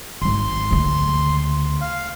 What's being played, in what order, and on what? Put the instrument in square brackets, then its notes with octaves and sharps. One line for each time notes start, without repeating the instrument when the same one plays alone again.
[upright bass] G#1 G#2 [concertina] C6
[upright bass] D2 C#3
[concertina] F5